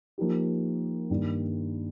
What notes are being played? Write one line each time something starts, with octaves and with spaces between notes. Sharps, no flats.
F3 A#3 D#4 G4
G2 D#3 G3 A#3